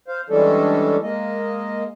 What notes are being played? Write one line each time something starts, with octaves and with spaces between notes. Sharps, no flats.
C5 F5
E3 G3 G#3 C#4 D4 A4
G#3 A#3 D#5